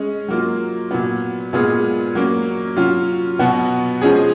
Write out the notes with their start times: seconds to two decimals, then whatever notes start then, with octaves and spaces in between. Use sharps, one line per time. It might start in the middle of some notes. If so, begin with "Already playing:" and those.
Already playing: G#3 C#4 G#4
0.28 F#3 A#3 F4
0.91 A#2 F#3 B3
1.53 A#2 G#3 B3 F4 G#4
2.15 F#3 A#3 C#4
2.77 F#3 C#4 F4
3.39 B2 F#3 B3 F#4
4.02 F3 G#3 C#4 G#4